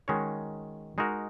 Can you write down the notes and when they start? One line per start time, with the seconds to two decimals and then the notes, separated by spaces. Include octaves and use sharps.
0.08 D#3 G#3 C#4 F#4 C#5
0.98 G#3 D#4 F#4 A#4